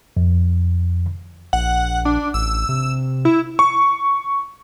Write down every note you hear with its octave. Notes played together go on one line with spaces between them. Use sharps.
F2
A#1 F#5
D4
A1 E6
C3
E4
C#6